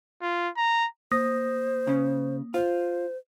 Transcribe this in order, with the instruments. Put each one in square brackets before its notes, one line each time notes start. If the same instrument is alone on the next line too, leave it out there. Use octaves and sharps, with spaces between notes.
[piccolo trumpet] F4
A#5
[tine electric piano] A#3 D#6 A#6 [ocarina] C5
[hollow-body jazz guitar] C#3 C#4
[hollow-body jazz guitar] F4 [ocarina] C5